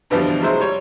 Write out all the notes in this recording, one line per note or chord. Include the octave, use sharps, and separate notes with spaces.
G2 B2 D3 E3 F3 G3
F#3 G#3 E4 C5
G3 C#5